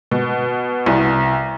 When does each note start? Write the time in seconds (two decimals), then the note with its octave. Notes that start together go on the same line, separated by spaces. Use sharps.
0.11 B2
0.86 C2